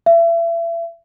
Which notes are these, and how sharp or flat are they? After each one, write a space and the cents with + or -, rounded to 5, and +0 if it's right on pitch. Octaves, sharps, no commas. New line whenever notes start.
E5 +35